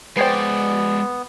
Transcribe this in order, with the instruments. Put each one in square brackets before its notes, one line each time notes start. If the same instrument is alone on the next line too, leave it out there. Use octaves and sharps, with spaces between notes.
[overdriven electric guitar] G#3 D5 [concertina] B3 [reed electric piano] B4 [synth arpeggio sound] C5 G5 C7